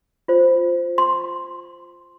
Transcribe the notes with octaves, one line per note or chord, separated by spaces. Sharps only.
F4 C5
C6